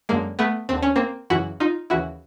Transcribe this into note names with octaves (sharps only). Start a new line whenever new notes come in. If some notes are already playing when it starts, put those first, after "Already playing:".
F#2 D3 G#3 A#3
A3 B3
D#2 D3 C4
C#4
A#3 C4
F#2 C#3 E3 E4 F#4
D#4 F4
D#2 C#3 E3 E4 F#4